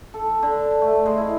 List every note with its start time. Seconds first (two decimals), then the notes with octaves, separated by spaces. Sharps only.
0.14 A4
0.43 D3
0.82 A3
1.06 G#3
1.18 E4